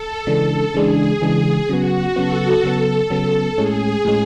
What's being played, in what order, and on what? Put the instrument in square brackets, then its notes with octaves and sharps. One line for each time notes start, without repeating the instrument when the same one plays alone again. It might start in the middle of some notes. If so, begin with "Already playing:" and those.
Already playing: [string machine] A4
[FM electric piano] C#3 E3 G#3 D4 [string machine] A4
[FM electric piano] C#3 E3 G#3 D4 [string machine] G#4
[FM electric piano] C#3 E3 G#3 D4
[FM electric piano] C#3 F#3 B3 [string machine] F#4
[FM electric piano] C#3 F#3 B3 [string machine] A4
[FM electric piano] C#3 F#3 B3
C#3 F#3 B3
[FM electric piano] A2 G#3 C#4 [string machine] G#4
[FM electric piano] A2 G#3 C#4